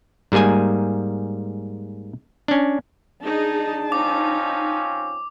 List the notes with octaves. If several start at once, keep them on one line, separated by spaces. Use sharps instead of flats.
G#2 G3 A#3 G#4 G#5
C#4 D4
D4 D#4 G#4 A5
F3 C4 C#4 D#4 D6